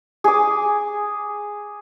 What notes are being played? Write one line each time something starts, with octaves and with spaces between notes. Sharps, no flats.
G#4 D6